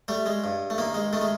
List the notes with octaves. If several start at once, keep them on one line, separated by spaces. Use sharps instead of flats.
G3 A3
G#3
G2
A3
D#3 A#3
G#3
D#3 A3
G#3